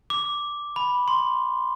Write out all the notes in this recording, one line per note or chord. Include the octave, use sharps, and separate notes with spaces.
D6
B5
C6